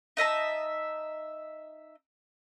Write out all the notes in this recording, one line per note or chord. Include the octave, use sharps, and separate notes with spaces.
D#4 D#5 E5 A5